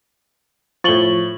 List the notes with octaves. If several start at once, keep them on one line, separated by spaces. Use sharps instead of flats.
A2 F3 C#6 A6 F#7 G7